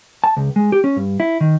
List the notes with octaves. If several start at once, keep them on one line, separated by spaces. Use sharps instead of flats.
A5
C#2
G#3
G4
C#4
G2
E4
D#3